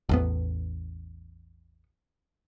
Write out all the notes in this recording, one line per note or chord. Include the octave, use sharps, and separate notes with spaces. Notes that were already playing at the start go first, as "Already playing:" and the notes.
A1 E2 B3